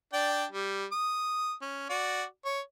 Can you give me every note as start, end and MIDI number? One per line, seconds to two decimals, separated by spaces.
0.13 0.45 62
0.13 0.45 74
0.13 0.45 79
0.51 0.85 55
0.92 1.53 87
1.61 1.85 61
1.89 2.23 66
1.89 2.23 74
2.45 2.60 73